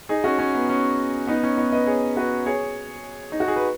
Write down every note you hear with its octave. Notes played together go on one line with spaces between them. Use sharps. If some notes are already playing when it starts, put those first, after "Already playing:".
D#4 G#4
C#4 F#4
C#4
B3
C#4
B3 D#4
C#4
B3 D#4
B4 D#5
G#4 C#5
F#4 B4
G#4 C#5
D#4
F#4
G#4
B4